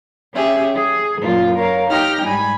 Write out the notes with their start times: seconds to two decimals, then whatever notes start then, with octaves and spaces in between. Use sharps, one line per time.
0.34 C#4 G4 G#4 E5
0.75 G#4
1.22 F#2 A#2 F4
1.55 A#4 C#5 F5
1.89 D#4 G4 G5 F6 A#6
2.26 G#2 G3 G#5 B5